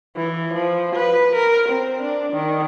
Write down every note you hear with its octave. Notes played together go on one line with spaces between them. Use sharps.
E3
F3
B4
A#4
C4
D4
D#3